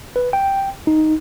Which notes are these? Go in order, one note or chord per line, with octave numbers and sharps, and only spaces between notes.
B4
G5
D#4